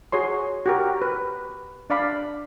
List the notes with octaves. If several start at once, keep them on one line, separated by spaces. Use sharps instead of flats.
F#4 G#4 C#5 C6
F#4 G4 A#4
B4
D4 D5 F5 B5